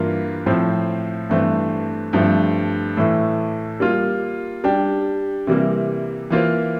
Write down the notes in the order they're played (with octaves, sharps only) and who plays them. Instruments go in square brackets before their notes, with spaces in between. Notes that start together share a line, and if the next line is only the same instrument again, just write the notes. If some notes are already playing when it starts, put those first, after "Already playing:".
Already playing: [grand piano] G2 E3 A#3 F4 A#4
A2 F3 C4
G2 E3 A3 C4
G2 F3 A3 C4
A2 E3 A3
G3 A#3 F4
G3 D4 G4
C3 E3 G3 A#3
E3 A#3 F4 C5